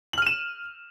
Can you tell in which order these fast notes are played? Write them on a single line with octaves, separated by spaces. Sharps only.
F#7 F6 D#7 E7